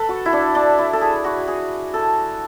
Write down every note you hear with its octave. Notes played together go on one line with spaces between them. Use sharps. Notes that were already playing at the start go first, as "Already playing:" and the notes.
Already playing: A4 B4
F#4
E4
D4
D4
E4
A4
G#4
F#4
G#4
A4